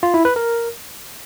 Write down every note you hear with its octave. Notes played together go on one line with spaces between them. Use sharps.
F4
E4
B4
A#4